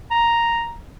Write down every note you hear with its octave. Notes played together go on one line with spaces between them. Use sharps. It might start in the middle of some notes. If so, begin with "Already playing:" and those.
A#5